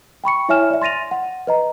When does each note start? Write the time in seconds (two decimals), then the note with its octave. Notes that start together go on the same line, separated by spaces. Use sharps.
0.24 G5 B5 C#6 C#7
0.49 E4 C#5 E5 G#5 F6 E7
0.70 D5 E5
0.82 C6 A6 A#6 D#7 F7
1.11 F#5
1.47 B4 D#5 A#5